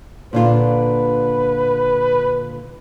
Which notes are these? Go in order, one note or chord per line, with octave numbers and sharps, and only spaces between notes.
A#2 D3 F4 B4